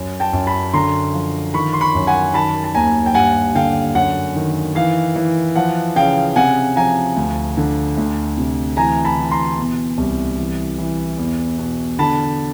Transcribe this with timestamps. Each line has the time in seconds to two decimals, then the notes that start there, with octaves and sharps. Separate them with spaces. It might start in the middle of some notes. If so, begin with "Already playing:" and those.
Already playing: F#2
0.20 G5 A5
0.33 F#2
0.47 A5 B5
0.74 D3 A#5 C6
1.14 F3
1.54 D#3 B5 C#6
1.73 C6
1.81 B5 C#6
1.95 F#2
2.07 F#5 G#5
2.34 D#3 A5 B5
2.64 A5
2.75 D#2 G#5 A#5
3.06 G5
3.14 G2 F#5 G#5
3.55 D3 F5 G5
3.95 F#2 F#5
4.36 D#3
4.75 E3 F5
5.15 E3
5.55 F3 F#5
5.96 C#3 F5 G5
6.36 C3 F#5 G#5
6.76 F3 G#5 A#5
7.16 D2
7.57 D3
7.97 D2
8.38 C3
8.77 E3 G#5 A#5
9.05 A5 B5
9.18 E3
9.31 A#5 C6
9.58 B2
9.98 C2
10.38 E3
10.78 E3
11.18 E2
11.58 B2
11.99 D3 A5 B5